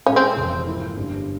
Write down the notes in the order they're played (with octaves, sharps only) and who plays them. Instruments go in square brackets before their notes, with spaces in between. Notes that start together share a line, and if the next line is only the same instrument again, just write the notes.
[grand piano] A#2 G#3 E4 G#4 C5 [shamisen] C#4
[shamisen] C4
[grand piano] F1 F2 C3 E3
G#2 F3 A#3 E4
G1 G2 G3 C#4